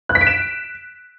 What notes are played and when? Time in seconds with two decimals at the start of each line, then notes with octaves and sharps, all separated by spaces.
0.09 F#6
0.15 B6
0.21 D7
0.27 E7